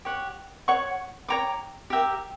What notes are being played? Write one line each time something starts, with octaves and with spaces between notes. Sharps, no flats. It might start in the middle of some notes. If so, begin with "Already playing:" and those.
G4 C#5 F#5
C#5 F#5 C#6
C#5 G5 A#5 D6
G4 A#4 E5 G5